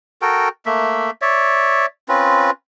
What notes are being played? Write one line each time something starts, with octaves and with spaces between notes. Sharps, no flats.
F#4 A4 A#4 G5
A3 A#3 E5
C#5 D5 E5
C4 C#4 F4 B4